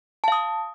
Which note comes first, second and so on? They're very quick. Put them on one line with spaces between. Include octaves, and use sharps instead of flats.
A5 F5 D#6